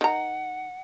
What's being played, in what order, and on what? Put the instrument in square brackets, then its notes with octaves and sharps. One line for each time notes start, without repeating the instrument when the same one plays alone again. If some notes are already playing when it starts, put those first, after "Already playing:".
[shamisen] D#3 A#5 [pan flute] F#5